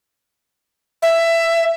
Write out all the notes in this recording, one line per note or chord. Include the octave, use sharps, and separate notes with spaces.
E5